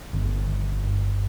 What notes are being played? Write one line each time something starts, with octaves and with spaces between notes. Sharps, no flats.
G1
G1
G2